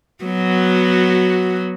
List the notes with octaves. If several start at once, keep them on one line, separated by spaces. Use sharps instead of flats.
F#3 B3 F#4